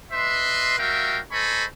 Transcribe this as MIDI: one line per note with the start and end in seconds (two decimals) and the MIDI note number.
0.11 0.78 71
0.11 0.78 75
0.11 0.78 76
0.11 0.78 84
0.78 1.18 55
0.78 1.18 66
0.78 1.18 70
0.78 1.18 76
0.78 1.18 77
0.78 1.18 79
1.32 1.64 69
1.32 1.64 72
1.32 1.64 75
1.32 1.64 80
1.32 1.64 83
1.32 1.64 85